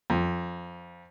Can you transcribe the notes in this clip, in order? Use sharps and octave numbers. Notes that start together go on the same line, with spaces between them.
F2